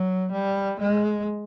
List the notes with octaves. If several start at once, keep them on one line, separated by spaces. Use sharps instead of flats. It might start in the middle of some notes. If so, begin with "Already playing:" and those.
Already playing: F#3
G3
G#3